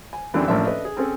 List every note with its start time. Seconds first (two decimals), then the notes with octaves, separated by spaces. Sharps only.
0.13 G#5
0.34 F#2 D3 E3 G3 C4 D4
0.48 A1 A2 F3 A#3 D4 E5
0.67 D4 A4 B4 D#5 E5
0.85 G#4
0.97 C4 C#4 G#4 A4